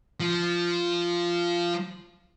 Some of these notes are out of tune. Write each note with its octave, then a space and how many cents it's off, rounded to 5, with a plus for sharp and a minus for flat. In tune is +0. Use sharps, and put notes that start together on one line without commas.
F3 -10